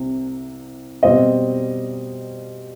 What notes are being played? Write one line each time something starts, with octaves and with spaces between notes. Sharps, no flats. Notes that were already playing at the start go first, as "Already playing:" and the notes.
Already playing: C2 C3
B2 G3 C4 D#5